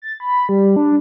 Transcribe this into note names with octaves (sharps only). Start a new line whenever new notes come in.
A6
B5
G3
D4